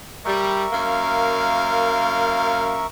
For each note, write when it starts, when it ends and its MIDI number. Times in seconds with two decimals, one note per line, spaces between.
0.25 0.65 55
0.25 2.86 70
0.25 2.86 76
0.25 2.86 85
0.72 2.81 42
0.72 2.81 58
0.72 2.81 77